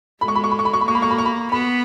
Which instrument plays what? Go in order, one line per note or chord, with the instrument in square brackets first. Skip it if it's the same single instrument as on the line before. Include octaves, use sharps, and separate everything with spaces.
[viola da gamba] G#3 [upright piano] B5
[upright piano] C#6
B5
C#6
B5
C#6
B5
C#6
B5
[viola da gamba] A#3 [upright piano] C#6
[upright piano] B5
C#6
B5
C#6
B5
[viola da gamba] B3 [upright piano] B5